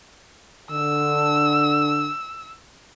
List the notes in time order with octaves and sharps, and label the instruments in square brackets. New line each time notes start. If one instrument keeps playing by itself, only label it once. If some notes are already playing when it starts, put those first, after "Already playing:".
[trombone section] D3 D4 [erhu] E6